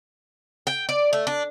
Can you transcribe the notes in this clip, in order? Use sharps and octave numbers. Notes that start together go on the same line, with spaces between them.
G5
D5
A3
D4